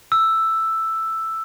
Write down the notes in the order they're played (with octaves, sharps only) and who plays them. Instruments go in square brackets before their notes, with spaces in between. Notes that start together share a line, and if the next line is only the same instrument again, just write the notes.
[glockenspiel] E6